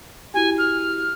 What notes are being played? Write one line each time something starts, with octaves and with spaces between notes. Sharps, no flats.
E4 F#4 G4 G#5
F6